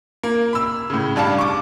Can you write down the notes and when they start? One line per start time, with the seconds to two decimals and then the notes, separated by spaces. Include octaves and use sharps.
0.23 A#3
0.53 B5 E6
0.90 A2 C#3
1.16 G2 D4 F5 A5
1.38 C#6 D6